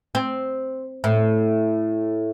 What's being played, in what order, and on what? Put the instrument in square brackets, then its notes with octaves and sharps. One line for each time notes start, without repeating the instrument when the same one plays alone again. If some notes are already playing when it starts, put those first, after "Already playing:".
[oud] C4
A2